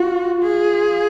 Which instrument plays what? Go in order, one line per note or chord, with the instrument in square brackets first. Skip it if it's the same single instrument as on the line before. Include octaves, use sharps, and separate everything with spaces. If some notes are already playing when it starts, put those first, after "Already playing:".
Already playing: [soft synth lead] F4 [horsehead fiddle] F#4
[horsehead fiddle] G#4